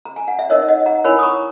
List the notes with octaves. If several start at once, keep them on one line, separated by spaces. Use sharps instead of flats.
A#5
G#5
F#5
E5
D#4 A#4 C#5 D#5
D#5 F#5
F#5 A#5
E4 A#4 C#5 G#5 B5
D#6
A#5 C#6